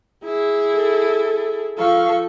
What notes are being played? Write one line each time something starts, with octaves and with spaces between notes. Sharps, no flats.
E4 G#4
A4
F3 A4 F5 C#6